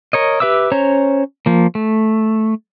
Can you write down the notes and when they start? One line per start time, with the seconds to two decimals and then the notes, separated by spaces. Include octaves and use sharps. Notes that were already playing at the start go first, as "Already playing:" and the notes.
0.13 A#4 C#5 D#5
0.40 G4 B4 E5 D6 E6
0.72 C#4 C5 C#5 A#5
1.46 F3 A#3
1.75 A3